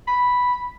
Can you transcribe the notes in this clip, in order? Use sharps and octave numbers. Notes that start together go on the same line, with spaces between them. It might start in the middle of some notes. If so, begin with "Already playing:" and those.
B5